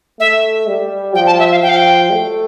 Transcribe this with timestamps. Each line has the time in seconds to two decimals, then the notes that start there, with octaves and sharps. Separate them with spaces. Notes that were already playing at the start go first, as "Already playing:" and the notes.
0.19 A3 E5
0.67 G3
1.15 F3 G5
1.26 A5
1.39 E5
1.51 F5
1.62 F3 G5
1.69 F5
1.77 G5
2.10 A3